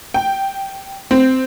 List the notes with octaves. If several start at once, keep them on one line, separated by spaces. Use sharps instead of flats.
G5
C4